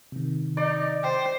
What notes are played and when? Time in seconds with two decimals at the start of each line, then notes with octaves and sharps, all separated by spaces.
0.12 C3 D#3
0.57 D#4 D5
1.04 C5 G5